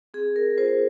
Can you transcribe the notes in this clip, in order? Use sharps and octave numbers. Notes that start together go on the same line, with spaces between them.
C4 G#4
A#4
F4 C5